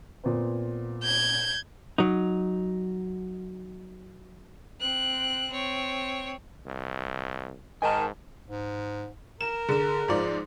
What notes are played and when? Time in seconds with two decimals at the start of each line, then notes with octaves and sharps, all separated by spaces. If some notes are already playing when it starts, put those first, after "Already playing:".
0.24 A#2 B3 C4
1.03 G6 G#6
1.98 F#3 D#4
4.80 C4 F#6
5.50 C4 C#5
6.66 C2
7.82 G#2 D#3 G#5 A5
8.48 G#2
9.41 A#4 E7
9.69 D3 G#4 E7
10.08 G#2 F3 D5